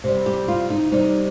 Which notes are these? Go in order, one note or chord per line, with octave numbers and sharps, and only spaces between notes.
C3 G3
G4
F4
D#4
C3 G3 D#4